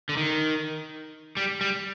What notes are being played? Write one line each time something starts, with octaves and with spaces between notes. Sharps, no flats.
D3
D#3
G3
G3